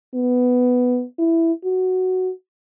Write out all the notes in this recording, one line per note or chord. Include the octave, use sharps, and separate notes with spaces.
B3
E4
F#4